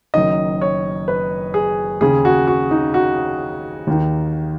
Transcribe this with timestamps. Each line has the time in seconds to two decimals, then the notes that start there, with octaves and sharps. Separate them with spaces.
0.14 F#1 F#2 D#3 D#5
0.61 C#5
1.08 B4
1.54 G#4
2.01 D#2 C#3 G#4
2.25 F#4
2.47 F#4
2.71 D#4
2.94 F#4
3.87 D#2 D#3